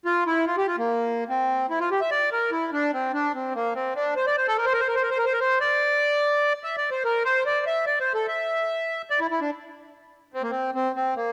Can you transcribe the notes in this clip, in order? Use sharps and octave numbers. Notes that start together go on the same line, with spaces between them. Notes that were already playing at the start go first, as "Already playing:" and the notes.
F4
E4
F4
G4
F4
A#3
C4
E4
F4
G4
E5
D5
A#4
E4
D4
C4
D4
C4
A#3
C4
D4
C5
D5
C5
A4
A#4
C5
A#4
C5
A#4
C5
A#4
C5
A#4
C5
A#4
C5
D5
E5
D5
C5
A#4
C5
D5
E5
D5
C5
A4
E5
D5
E4
E4
D4
C4
A#3
C4
C4
C4
A#3